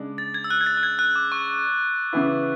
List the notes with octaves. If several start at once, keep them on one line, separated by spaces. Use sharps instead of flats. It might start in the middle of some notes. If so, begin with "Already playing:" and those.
Already playing: C#3 G#3 D4
A6
G#6
E6
F#6
G#6
A6
F#6
G#6
F#6
D6
C#6
C#3 E3 B3 E4